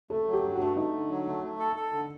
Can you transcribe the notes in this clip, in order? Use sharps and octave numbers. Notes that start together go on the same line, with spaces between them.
A3 A4
F#3
G4
G2
A3 F#4
A3 D#4
D3
F#3
A3
A3
A4
A4
D3